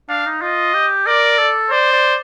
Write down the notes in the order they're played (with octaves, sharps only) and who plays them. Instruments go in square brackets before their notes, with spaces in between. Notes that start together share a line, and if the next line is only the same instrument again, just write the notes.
[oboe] D4 [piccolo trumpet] F5
[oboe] D#4
[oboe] F4 [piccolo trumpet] D#5
[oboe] G4
[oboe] A#4 [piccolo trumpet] D5
[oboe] A4
[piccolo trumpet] C5 [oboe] D5
[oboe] D5